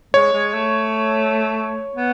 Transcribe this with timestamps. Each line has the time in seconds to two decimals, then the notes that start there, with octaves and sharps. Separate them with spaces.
0.14 G#3 C#5
0.33 G#3
0.54 A3
1.95 B3